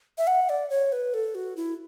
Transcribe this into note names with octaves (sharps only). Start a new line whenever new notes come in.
E5
F#5
D5
C#5
B4
A4
F#4
E4